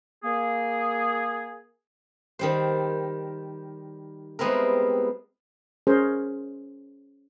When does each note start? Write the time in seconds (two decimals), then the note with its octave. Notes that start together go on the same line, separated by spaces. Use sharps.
0.24 A#3 G#4
2.39 D#3 G3 C5
4.39 G3 G#3 B3 C4 E4 A#4
5.87 C#4 G#4 A#4 C5